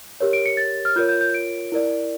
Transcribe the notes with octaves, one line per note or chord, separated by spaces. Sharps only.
G4 A#4 C#5
D7
C#7
A6
F6
F4 A#4 C#5 G6
G6
G6
D7
E4 A#4 D5